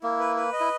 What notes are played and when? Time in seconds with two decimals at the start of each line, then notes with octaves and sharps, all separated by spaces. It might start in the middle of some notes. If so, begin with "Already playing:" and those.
0.02 A#3 E4
0.19 B4
0.36 B4
0.53 D#5
0.60 E4